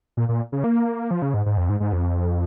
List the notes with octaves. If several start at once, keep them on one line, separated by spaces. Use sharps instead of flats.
A#2
A#2
C#3
A#3
F3
C#3
G#2
G#2
F2
G#2
G#2
F2